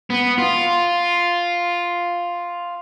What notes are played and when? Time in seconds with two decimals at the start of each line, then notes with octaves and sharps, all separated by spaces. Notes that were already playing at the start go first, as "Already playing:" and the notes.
0.10 B3
0.38 F4